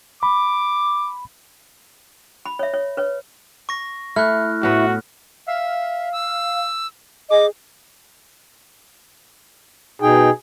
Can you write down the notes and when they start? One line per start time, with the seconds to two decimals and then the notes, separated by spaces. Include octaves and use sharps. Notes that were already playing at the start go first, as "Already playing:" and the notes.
0.23 B5 D6
2.46 B5
2.59 C#5 E5
2.74 C#5
2.97 B4 C#5
3.69 C#6 A#6
4.16 A3 E4 F6 F#6
4.63 A2 B3 F#4
5.47 E5 F5
6.12 E6
7.30 G#4 D#5 D6
10.02 B2 D#4 G#4 G5